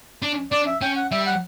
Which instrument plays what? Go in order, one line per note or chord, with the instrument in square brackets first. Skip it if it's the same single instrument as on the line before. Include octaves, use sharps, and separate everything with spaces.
[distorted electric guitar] D4
[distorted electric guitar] D4 [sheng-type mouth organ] D5
[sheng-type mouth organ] E5
[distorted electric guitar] C#4 [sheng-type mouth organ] G5
[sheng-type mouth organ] F#5
[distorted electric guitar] G3 [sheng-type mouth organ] E5
[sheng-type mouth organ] F#5